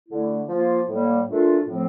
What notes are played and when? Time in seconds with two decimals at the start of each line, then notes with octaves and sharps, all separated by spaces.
0.09 D3 A3 E4
0.48 F3 A#3 F4
0.88 A2 G3 A#3
1.27 A#2 A3 D4 F4
1.66 A2 F3 A3 C4